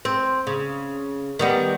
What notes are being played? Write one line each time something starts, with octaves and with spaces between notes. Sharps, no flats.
C4
C#3
D#3 G3 B3